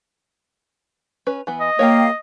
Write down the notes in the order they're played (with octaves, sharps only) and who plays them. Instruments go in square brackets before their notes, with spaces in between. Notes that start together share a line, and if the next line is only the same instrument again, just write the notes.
[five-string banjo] C#4 B4
E3 B3
[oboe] D#5
[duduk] A#3 [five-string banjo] G4 A#4 C#5 [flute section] F5 G5